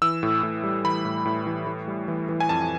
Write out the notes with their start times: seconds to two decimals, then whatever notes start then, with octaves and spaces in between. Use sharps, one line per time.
0.02 E3 E6
0.23 A2
0.43 A2
0.64 G3
0.84 E3 B5
1.05 A2
1.25 A2
1.46 E3
1.67 E3
1.88 G3
2.08 E3
2.29 E3
2.40 G#5
2.49 F2 A5